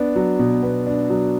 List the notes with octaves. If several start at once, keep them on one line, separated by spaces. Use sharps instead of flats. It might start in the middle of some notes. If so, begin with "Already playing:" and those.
Already playing: B3 D4
F#3
B2
B3
D4
F#3